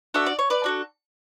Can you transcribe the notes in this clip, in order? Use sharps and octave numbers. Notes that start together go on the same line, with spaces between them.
D4 F#4 A4 E5
D5
C#5
B4 D5
D4 F#4 A4